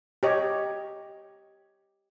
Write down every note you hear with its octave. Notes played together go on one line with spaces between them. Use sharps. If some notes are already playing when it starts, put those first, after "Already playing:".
G4 C#5 D#5